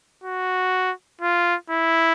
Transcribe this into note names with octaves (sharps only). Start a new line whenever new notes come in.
F#4
F4
E4